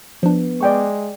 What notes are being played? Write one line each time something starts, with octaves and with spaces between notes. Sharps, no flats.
F3 B3 D4
G#3 D5 G5 C#6